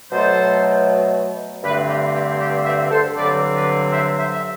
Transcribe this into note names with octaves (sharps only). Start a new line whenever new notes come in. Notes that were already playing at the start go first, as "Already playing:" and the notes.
B2 F#3 A3 A4 C5
G2 D3 A3 C4 G4 B4
G4
G4
G4
C5 E5
A4 C5
G2 D3 F#3 C4 B4 D5
B4 D5
C5 E5
C5 E5
E5